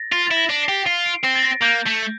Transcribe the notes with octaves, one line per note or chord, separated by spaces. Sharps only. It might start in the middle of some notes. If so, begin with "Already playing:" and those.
Already playing: A6 A#6
F4 A6
E4 A6
A#6
D4
C7
G4
F4 C7
D7
C4 D7
A6
A#6
A#3 G6
A3